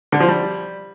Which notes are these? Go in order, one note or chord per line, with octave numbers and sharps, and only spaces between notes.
D3
F3
G3